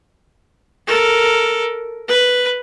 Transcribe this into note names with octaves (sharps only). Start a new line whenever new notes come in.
A4 A#4
B4